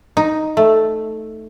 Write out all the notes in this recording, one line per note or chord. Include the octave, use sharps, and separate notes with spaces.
D#4
A3